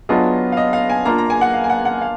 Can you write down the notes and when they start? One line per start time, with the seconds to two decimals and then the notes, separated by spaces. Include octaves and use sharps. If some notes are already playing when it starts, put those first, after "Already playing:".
0.09 F#3 B3 D4 F4 G#4 D#5
0.52 F5
0.57 D#5
0.73 F5
0.90 G#5
1.05 A#3 D4 F4 A#4 A#5
1.18 A#5
1.30 G#5
1.41 F#5
1.54 F5
1.64 G#5
1.70 F#5
1.85 F#5
2.01 F5